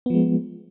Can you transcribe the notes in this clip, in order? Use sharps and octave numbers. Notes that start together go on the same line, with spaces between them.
F3 G#3 B3